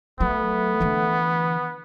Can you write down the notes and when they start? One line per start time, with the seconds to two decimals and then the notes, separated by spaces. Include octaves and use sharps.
0.20 F#3 A3 B3
0.80 D3 E3